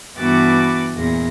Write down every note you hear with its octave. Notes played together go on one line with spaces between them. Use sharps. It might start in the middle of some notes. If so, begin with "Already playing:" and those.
G2 E3 B3 F#4 D6 A6
E2 A#2 A#6